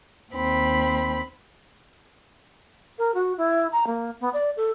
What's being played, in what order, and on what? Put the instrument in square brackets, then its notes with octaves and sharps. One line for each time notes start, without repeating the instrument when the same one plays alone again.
[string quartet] D#2 C4 B5
[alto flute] A#4
F#4
E4
A#5
A#3
B3
D5
A4